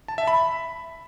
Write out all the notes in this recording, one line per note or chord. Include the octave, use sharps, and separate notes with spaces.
A5
E5
B5